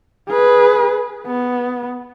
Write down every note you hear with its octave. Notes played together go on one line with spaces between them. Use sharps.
G#4 B4
B3